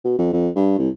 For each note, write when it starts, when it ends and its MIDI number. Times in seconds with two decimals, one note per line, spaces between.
0.05 0.18 47
0.18 0.28 41
0.33 0.49 41
0.56 0.74 43
0.78 0.89 36